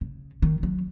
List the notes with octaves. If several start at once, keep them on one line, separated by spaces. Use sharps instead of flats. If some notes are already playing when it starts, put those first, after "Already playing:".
C#3
D#3
F#3